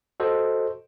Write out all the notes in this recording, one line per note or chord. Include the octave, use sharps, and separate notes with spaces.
F#4 A4 C5 D#5